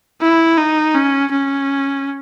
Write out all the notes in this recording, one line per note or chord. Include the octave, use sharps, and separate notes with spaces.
E4
D#4
C#4
C#4